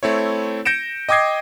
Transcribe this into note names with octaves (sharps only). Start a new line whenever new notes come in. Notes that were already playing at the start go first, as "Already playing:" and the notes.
A3 C4 E4 C#5
G6 A#6 C#7 D7 E7
D#5 G5 D6 D#6 G#6 C7